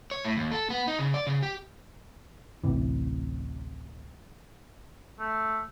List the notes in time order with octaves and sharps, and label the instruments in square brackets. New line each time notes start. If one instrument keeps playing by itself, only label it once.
[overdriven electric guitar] C#5
A2
D#2
A4
B3
D#4
C#3
D5
C#3
G4
[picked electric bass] D1 A1 C3 E3
[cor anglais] A3